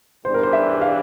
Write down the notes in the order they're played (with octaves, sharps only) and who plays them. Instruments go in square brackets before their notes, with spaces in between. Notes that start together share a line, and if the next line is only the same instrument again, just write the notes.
[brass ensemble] E2 E3 G3 D4 [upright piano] C5
[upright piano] A#4
C5
E5
F5